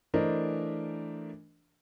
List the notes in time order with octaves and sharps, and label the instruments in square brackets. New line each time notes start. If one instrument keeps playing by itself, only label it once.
[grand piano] E3 A3 D4 A#4 C5 D#5